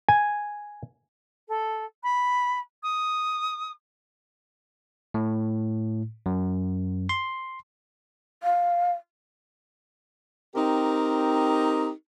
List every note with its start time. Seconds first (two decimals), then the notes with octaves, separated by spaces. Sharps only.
0.09 G#5
1.49 A4
2.03 B5
2.83 D#6
5.14 A2
6.26 F#2
7.09 C6
8.43 F5
10.54 C4 D#4 G4 A#4